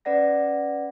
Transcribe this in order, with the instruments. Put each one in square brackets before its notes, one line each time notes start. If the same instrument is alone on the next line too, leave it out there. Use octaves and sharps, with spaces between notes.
[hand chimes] C#4 B4 D5 F#5 A#6